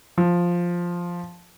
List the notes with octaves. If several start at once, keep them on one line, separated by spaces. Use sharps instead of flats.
F3